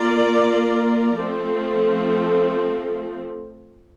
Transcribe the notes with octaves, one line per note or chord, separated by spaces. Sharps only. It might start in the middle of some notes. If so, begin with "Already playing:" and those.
Already playing: A#3 F4 A#4 D5
F3 A3 C4